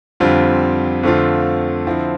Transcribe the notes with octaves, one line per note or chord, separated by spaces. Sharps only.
F2 D3 G3 C4 F4
F2 D3 A3 C4 F4
D3 F3 C4 E4